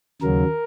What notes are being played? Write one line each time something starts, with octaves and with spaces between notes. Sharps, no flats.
D#2 C#3 F#3 A#4